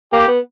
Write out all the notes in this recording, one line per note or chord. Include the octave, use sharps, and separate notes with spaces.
A#3 G4
B3